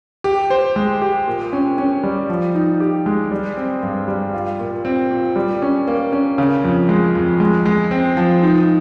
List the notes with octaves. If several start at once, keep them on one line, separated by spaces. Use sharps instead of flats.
G4
C5
G#3
G4
A#2
C#4
C#4
G3
F3
D#4
G4
G#3
G3
C4
G2
G3
F4
A#2
C4
A#2
G3
C#4
A#3
C#4
C#3
F2
G#3
F2
G#3
G#3
C4
F3
D#4